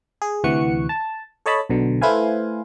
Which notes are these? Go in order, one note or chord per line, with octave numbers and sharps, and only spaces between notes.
G#4
D2 C3 E3 F#5 C#6 C#7
A5
A4 C#5 D#5 A5 B5
B1 B2 D3
A3 E4 B4 C5 F5 G#5